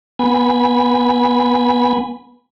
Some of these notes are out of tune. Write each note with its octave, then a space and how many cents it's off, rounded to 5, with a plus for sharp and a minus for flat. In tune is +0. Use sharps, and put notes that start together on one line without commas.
B3 -15 G#5 -10 B5 +0